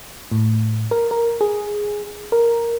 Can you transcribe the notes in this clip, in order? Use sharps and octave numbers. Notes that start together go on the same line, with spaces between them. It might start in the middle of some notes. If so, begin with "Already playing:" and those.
A2
A#4
A#4
G#4
A#4